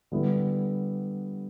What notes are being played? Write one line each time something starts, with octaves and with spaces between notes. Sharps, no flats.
D3 G3 B3 E4